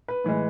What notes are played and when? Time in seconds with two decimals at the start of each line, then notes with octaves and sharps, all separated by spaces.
0.08 B4
0.24 A2 E3 G#3